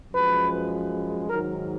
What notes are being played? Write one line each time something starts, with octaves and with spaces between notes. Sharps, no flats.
F#2 F3 G#3 B4
G#2 D#3 F#3 A#4